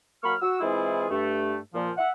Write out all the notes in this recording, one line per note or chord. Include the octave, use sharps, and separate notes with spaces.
F#3 A#3 B5 C#6 F6
F#4 E6
E3 G#3 C4 E4 F4 G#4
G2 A3
A#2 F3
E5 F#5